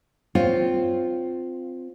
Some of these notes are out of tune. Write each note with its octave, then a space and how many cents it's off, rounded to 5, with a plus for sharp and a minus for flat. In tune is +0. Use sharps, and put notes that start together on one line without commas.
C4 -15 F4 +0 C#5 +0